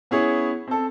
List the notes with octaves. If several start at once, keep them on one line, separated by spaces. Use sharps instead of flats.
B3 C#4 E4 G#4 C#5
C4 A4